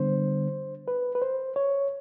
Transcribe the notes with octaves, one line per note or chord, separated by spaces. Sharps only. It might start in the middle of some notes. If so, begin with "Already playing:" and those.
Already playing: D3 G3 B3 D4 C5
B4
B4
C5
C#5